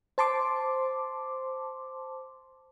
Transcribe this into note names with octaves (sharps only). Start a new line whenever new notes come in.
C5 A5 C6 D6